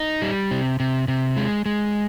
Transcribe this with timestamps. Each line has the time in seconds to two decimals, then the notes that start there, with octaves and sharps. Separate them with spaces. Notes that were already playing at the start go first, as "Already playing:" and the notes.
Already playing: D#4
0.22 G3
0.51 C3
0.80 C3
1.08 C3
1.37 G#3
1.66 G#3